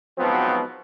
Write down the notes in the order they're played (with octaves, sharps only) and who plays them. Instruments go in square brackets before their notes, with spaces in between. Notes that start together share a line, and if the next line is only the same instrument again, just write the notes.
[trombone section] G#2 B2 F3 F#3 B3 C4